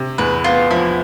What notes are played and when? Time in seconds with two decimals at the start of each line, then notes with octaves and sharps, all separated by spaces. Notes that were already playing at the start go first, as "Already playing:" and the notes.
Already playing: C3
0.18 E2 B4
0.44 B3 F4
0.70 F3 E4